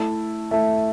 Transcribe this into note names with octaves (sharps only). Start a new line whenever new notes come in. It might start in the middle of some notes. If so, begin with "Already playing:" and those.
Already playing: A3 E4 A4 E5
A3 E4 A4 E5